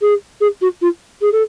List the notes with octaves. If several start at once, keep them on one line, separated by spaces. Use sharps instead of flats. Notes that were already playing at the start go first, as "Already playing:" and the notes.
G#4
G#4
F#4
F4
G#4
A4